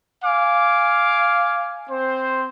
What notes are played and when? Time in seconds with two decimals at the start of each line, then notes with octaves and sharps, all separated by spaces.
0.24 F5 G#5 D6
1.90 C4 C5